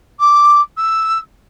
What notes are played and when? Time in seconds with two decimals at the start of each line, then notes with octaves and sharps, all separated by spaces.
0.19 D6
0.77 E6